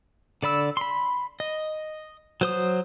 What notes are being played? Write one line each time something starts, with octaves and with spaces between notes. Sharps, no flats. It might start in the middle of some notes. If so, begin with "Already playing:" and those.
D3 D5 B5 E6
B5 C6
D#5
F#3 C5 D#6